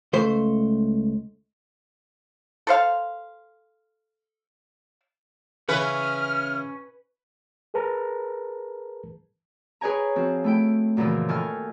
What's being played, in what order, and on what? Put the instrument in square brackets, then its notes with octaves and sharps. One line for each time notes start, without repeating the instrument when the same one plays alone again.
[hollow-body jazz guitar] C#2 A3 C5
[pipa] A4 C5 F5
[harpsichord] C#3 E3 [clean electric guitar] C#4 [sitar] B4 [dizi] F6
[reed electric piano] G#4 A#4 B4 A5 A#5
[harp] G#4 B4 C#5 G5 G#5 A#5
F3 C4 F#4
A3 E4 G5
F#2 A#2 C#3 E3 F3
D#3 F4 A4 G#5 C#6 F6